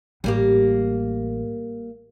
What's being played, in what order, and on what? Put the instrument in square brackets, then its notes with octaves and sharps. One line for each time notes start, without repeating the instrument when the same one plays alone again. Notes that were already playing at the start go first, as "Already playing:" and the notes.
[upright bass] A1 [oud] G3 A#3 G4